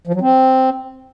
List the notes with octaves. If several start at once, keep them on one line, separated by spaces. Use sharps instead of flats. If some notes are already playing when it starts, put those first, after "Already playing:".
F3
F#3
C4